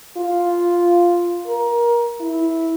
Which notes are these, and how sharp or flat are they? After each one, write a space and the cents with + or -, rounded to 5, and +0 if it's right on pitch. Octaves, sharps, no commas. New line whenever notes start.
F4 +0
A#4 +20
E4 -10